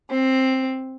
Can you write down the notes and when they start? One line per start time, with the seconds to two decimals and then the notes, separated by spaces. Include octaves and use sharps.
0.11 C4